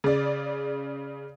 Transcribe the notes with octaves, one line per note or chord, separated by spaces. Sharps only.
C#3 D5